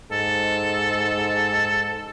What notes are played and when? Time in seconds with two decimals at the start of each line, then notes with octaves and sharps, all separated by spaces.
0.12 G#2 A4